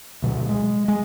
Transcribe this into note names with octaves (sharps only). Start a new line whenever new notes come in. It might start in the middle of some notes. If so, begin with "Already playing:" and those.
D2 B2 F#3
G#3
G#3